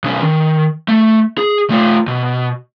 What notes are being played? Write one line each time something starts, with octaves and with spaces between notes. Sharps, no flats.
B1 C#4
D#3
A3
G#4
A3 F4
B2